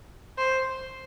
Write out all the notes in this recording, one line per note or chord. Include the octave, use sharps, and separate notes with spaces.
C5